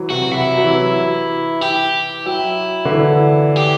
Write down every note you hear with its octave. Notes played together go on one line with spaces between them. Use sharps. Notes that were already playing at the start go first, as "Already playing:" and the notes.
Already playing: E3 F#3
C3 F#4
C3 E4
F#3
E3
G4
F#3 E4
D3
E3
G4